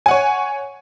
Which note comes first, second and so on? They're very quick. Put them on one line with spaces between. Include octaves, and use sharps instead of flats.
G#5 F#5 C#5